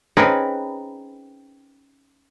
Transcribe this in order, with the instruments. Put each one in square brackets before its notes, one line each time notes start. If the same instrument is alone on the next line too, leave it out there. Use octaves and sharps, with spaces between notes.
[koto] C4 C#4 D#4 G#4 A#4 B4